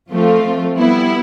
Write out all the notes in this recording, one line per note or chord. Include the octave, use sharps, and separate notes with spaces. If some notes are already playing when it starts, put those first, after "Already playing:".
F3 A3 C4 F4
G3 B3 E4